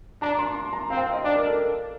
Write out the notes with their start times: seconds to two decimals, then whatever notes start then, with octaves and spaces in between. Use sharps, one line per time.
0.22 D4 A#5
0.39 C6
0.56 C6
0.73 A#5
0.90 C4 F5
0.97 G5
1.02 F5
1.13 D#5
1.24 D4 D5
1.36 A#4
1.47 A4